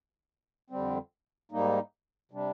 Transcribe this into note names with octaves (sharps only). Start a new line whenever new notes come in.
F2 D3 G3 C4
G#2 G3 A#3 D#4
C3 G3 D4